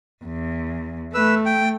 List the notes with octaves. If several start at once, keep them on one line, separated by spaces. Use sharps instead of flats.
E2
A3 B4 E6
G5